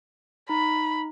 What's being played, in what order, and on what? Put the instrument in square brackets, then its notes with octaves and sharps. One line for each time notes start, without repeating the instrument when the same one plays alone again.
[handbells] D#4 [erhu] B5